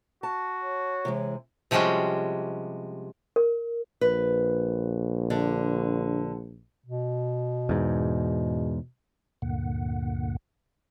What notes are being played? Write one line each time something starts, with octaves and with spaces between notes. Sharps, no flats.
F#4 A5
C#5
C3 E3 G#3
C3 F3 G3 G#3 C#4 F#4
A#4
A#1 B4
D3 D5
B2
E2 G#2
D2 G2 A#2 D3 A#3 F#5